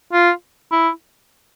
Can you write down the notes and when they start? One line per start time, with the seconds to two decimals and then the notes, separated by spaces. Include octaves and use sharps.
0.13 F4
0.72 E4